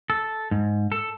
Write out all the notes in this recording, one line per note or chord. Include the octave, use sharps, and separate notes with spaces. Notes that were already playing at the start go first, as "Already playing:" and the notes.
A4
G#2
A4